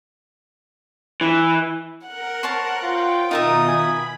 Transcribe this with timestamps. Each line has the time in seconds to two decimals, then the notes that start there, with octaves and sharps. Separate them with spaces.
1.21 E3
2.07 A#4 F#5
2.43 C5 C#5 A5
2.83 F4 G5
3.31 B2 D#3 D#4 F4 A#4 E5 D#6
3.68 G#5 B5